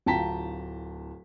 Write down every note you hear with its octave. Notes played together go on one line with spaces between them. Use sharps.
D1 F4 G5 A5 A#5 B6